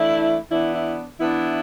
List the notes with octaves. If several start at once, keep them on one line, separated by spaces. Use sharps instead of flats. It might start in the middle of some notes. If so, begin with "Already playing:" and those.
Already playing: E3 A3 D4 E4
E3 B3 D4 E4
E4
E3 B3 D4 E4